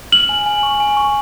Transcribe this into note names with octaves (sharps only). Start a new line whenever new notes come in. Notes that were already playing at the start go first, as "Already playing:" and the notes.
F6 F#7
G#5
G#5
C#6
G#5
C#6